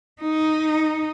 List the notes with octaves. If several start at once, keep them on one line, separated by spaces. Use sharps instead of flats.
D#4